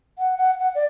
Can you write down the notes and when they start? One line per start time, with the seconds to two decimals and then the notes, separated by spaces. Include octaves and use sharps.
0.18 F#5
0.38 F#5
0.60 F#5
0.75 D5